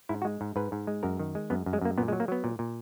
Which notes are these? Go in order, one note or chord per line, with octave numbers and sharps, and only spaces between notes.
G#2 E4
F#4
G#3
G#2
G#2 B4
G#2
G#3
F#2 A#4
D#3
G#3
F#2 B3
F#2
G#3
F#2 A#3
A#2 B3
G#3
F#3
A#3
F#3 B3
A#2
A#2